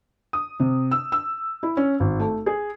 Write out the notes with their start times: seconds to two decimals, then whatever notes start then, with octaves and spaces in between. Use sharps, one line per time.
0.33 D#6
0.60 C3
0.91 E6
1.12 E6
1.63 E4
1.77 C#4
2.00 G#1
2.20 A3
2.46 G#4